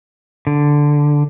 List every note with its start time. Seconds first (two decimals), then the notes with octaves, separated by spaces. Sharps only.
0.47 D3